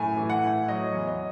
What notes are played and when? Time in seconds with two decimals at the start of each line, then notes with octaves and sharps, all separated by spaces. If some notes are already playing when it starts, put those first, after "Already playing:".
Already playing: F#2 A2 G#5
0.17 E3
0.30 F#5
0.43 A2
0.68 F#3 D#5
0.94 E2
1.08 D#5